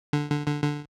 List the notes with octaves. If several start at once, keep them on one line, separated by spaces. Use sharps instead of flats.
D3
D3
D3
D3